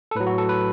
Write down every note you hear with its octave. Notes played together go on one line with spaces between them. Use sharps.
A4
A2 F#3 B4
F#4
A4
B4